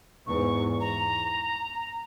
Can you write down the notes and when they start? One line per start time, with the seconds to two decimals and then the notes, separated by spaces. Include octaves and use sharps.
0.27 E2 G#2 C#6
0.80 A#5